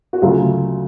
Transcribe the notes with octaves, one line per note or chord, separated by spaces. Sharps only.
F#4
D2 C#3 F#3 A3 F4